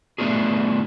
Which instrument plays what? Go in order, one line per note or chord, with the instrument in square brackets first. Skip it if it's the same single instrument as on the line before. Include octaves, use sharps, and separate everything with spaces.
[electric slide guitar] A3 B3 D4 F4 G#4